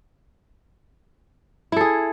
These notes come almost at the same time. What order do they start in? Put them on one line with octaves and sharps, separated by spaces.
E4 A4 G#4